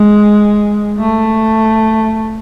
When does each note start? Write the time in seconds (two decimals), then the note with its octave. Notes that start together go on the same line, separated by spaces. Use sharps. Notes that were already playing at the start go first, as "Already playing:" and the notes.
Already playing: G#3
0.98 A3